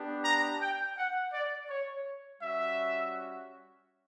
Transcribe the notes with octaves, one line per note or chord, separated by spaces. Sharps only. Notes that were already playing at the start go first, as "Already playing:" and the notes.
Already playing: B3 D4 G4
A#5
G5
F#5
D5
C#5
G3 C#4 F#4 E5